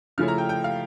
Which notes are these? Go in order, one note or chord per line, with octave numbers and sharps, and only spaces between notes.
C#3 F3 A3 C#4 E4 F6
A#5
G5
G5
F5